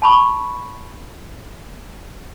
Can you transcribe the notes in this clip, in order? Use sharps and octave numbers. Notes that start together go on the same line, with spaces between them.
A5 B5 C#6